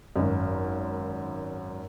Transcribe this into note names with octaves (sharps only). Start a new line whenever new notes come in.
G#1 F#2